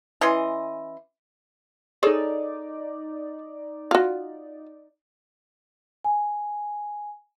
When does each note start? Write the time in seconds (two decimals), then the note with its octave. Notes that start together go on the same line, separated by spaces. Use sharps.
0.21 E3 C#4 D#5 C6
2.03 D#4 G#4 A4 C#5 D5
3.91 F4 F#4
6.05 G#5